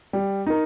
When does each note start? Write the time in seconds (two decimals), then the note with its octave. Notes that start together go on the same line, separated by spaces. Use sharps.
0.13 G3
0.46 D#4 A#4